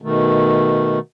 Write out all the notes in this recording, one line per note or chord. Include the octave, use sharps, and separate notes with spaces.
B2 D#3 A3